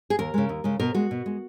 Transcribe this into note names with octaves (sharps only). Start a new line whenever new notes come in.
G#4
D#2 A#4
C#3 G#3
D#2
C#3 G#3
B2 A#4
G#3 F#4
B2
G#3